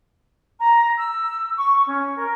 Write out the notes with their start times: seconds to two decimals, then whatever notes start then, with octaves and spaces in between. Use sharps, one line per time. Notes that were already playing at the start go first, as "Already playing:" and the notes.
0.59 A#5
0.98 E6
1.56 C#6
1.87 C#4
2.15 A#4